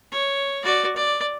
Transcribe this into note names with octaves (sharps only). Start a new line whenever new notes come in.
C#5
F#4 D5
D5